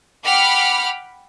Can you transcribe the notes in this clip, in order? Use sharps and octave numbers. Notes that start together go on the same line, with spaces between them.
F#5 G5 B5 D6 F6